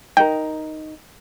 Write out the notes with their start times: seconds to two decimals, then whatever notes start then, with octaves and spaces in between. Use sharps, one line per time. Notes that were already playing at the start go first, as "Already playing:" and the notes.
0.17 D#4 A#4 G5